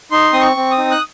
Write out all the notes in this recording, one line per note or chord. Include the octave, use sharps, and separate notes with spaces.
D#4 C6
C4 D#6
C#6
C4
D#6
D#4
F#6